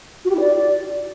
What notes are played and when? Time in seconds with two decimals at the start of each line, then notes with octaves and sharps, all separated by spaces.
0.25 F#4
0.30 G4
0.35 E4
0.40 D5